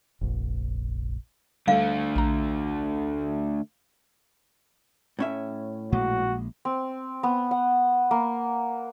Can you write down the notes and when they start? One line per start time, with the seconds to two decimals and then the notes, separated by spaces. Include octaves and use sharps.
0.21 F1 A#1
1.68 D3 G3 A3 F5
2.16 A#1 A#5
5.19 A2 C#4 E5
5.92 A#1 A#2 G#3 F#4
6.65 C4
7.23 B3
7.51 F#5
8.11 A#3